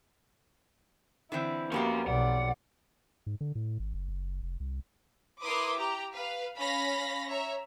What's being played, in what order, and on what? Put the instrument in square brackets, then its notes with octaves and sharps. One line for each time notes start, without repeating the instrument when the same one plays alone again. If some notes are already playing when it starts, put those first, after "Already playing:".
[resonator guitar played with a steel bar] D3 E3 C4 [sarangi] E4
[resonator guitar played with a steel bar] F2 B3 G4 [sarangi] A#3 [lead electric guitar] C#4 F#4
[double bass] B1 [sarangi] D5 [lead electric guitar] F#5
[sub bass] G#2
D3
A2
G#1
F#1
F#1
F1
C2
[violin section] E4 A#4 B4 C6 D6 D#6
G4 A#5
B4 F5
C#4 F5 B5 A#6
C#5 E5 A#5